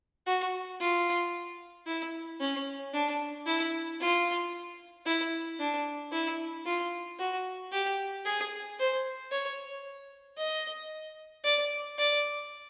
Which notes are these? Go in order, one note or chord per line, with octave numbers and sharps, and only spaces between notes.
F#4
F4
E4
C#4
D4
E4
F4
E4
D4
E4
F4
F#4
G4
G#4
C5
C#5
D#5
D5
D5